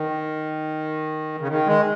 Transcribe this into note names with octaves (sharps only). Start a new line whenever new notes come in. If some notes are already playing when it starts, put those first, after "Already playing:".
Already playing: D#3
C#3
D#3
G#3